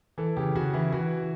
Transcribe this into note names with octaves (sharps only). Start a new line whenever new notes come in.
E3 A4
C#3 G4
C#3 F#4
E3 E4
E3 F#4